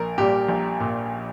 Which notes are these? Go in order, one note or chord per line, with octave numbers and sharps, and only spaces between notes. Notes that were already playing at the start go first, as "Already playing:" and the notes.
Already playing: A#1 A#4
A#2 G3 G4
A#1
A#2